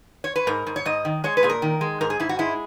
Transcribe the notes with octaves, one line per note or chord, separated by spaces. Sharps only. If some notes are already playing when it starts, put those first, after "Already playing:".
C#5
B4
G#2 A#4
G#2
C#5
G#2 D#5
D#3
G#3 C#5
B4
A#2 G#4
A#4
D#3
G#3
G#2 A#4
G#4
G#2 E4
F#4
G#3 E4